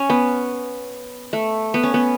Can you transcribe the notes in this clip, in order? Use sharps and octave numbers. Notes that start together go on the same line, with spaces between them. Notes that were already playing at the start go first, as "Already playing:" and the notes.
Already playing: C#4
B3
A3
B3
C#4
B3